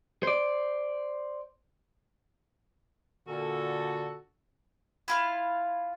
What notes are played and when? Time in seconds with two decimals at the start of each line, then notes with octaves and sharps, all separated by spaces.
0.23 C5 D5
3.27 A#2 D3 F#4 A4
5.08 E4 F4 F5